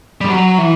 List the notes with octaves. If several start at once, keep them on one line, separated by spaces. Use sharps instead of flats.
G3
F#3
E3